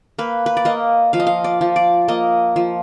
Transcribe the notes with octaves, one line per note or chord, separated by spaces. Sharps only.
A#3 B4
B4
D5
A#3 D#5
F3 F5
D#5
F5
D5
F3
D5
A#3 D#5
F3